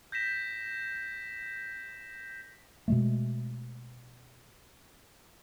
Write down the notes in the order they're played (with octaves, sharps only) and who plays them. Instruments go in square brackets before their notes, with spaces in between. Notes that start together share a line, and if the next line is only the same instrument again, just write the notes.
[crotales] G6 A#6 B6 E7
[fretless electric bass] B2 G#3 A3